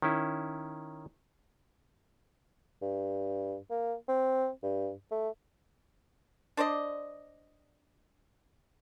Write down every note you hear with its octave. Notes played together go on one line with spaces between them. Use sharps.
D#3 C#4 E4
G2
A#3
C4
G2
A3
D4 C5 D5 D#5